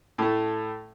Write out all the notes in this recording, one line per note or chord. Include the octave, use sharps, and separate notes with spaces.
A2 A3